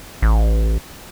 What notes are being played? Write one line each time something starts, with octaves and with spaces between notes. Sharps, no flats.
A1